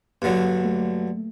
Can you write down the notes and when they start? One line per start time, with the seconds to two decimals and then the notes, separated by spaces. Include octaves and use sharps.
0.22 G2 D3 F#3 A#3
0.65 A3